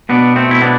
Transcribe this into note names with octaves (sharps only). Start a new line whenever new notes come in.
B2 B3 D4
A3 C4
B2 E4
B3 D4